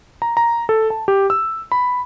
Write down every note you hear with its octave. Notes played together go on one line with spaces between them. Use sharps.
A#5
A#5
A4
A5
G4
E6
B5